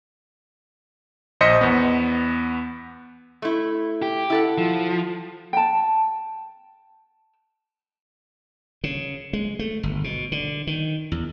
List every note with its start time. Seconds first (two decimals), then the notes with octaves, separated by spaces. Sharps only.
1.41 A#1 C5 D#5 B6 C#7
1.61 E2 B3
3.42 A3 E4
4.02 G4
4.30 E4 A4 F#5
4.58 F3
5.53 G5 A5
8.84 C#3
9.33 G#3
9.59 A3
9.83 G1
10.04 B2
10.32 D3
10.67 D#3
11.12 E2